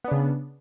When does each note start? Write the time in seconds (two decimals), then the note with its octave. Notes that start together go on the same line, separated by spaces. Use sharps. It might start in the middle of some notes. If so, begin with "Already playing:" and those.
0.04 B3
0.08 D4
0.11 C#3